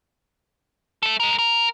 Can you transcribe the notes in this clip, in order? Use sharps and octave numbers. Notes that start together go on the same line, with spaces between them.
A3 A4
G#3 A#4
A#4